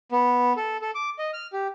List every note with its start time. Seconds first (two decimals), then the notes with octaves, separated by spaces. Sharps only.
0.12 B3
0.57 A4
0.82 A4
0.95 D6
1.19 D#5
1.33 F6
1.53 G4